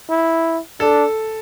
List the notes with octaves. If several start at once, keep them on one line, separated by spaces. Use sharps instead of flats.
E4
D4 A4